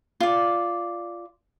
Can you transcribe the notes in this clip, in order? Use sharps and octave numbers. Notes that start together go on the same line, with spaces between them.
F4 D5